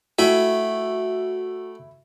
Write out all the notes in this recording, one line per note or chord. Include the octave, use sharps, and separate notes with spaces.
A3 E4 F#4 G5 B5